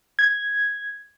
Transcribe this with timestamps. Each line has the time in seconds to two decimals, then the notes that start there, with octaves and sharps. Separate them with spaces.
0.19 G#6